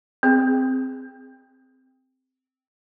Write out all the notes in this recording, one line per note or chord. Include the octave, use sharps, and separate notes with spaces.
C4 G#4